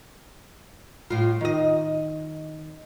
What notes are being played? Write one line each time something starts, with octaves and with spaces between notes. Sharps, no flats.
A2 F4
D#3 D#5